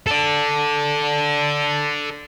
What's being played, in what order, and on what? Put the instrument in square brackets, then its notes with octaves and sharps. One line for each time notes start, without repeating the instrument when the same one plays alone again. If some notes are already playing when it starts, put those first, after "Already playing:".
[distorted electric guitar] A4 D5